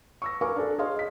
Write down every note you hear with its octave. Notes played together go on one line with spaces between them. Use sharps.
C#6 E6 A#6
A#4 F5 G#5 C#6 D6
D4 A4
G#4 C#5 D#5 F5 C6
D#5 B6